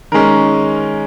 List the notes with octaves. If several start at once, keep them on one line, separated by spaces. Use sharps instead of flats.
D#3 G#3 C#4 A#4